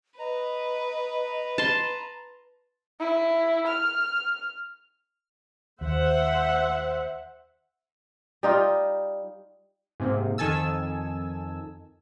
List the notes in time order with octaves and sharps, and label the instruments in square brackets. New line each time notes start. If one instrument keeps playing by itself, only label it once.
[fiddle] B4 [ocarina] D#5 [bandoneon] A#5
[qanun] A5 C6
[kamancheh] E4
F6
[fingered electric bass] D#2 [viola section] C5 E5 F#5
[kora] G3 D#4 F4
[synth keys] G#2 C3 A#3
F2 D#3 A4 G#5 A5 E6